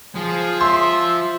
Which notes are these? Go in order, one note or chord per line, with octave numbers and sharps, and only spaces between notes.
F3 G#4
E5 C6